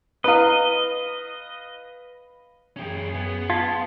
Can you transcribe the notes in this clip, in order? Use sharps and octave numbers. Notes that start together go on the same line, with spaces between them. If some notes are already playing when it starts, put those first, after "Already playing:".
E4 B4 D#5 F5 D#6
F#2 C#4 G4 G#4
B3
F4 A5 G#6 B6